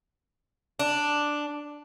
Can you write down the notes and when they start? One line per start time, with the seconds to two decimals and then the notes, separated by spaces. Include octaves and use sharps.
0.79 D4